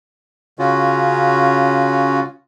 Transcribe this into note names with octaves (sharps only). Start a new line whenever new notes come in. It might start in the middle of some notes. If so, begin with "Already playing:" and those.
C#3 C#4 F4 F#4